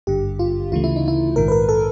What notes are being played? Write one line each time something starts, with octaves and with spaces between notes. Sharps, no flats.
G#1 G2 D3 G4
F4
D2 C#3 E3 A3 F4
E4
D#4
E4
A#1 G#2 D#3 A#4
B4
A#4
A4